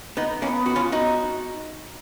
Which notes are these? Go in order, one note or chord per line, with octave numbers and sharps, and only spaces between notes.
B3 D#4
A#3 B3 C#4
F#4
C#4 F4
B3 D#4 F#4